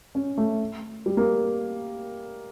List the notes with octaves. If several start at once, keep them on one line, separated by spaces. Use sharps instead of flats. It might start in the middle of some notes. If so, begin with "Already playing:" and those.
C#4
A3
G3
A#3